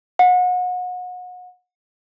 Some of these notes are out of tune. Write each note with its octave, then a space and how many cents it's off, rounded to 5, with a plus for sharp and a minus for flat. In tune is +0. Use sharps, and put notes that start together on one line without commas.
F#5 -30